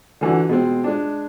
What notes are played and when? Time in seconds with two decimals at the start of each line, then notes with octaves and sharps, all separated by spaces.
0.21 D3 E3 D4 F#4
0.49 B2 G#3 C4
0.84 G#3 D4